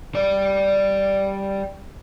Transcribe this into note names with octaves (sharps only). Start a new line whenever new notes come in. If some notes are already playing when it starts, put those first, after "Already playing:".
G3 D5